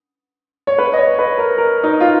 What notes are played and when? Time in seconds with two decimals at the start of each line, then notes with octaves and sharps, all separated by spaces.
0.67 C#5
0.78 B4
0.93 D#5
0.98 C#5
1.19 B4
1.38 A#4
1.58 A#4
1.83 D#4
2.00 F4